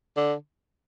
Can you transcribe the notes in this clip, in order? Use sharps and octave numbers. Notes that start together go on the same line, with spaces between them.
D3